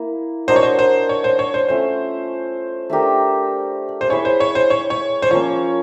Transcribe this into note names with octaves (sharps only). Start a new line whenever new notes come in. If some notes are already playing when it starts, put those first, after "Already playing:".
Already playing: A#3 E4
D4 F#4 A#4 C5 D#5
C#5
C5
C5
C#5
C5
C#5
C5
A3 C#4 F4 C5
A3 D4 G4 A#4
C5
E4 G#4 B4 C#5
C5
C#5
C5
C#5
C#5
C5
F3 A#3 C#4 C#5